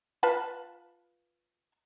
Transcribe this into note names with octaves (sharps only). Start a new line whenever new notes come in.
F4 B4 A5